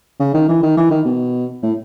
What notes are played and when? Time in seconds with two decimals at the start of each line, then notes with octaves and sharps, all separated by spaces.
0.20 C#3
0.34 D#3
0.48 E3
0.62 D#3
0.77 E3
0.91 D#3
1.06 B2
1.63 A2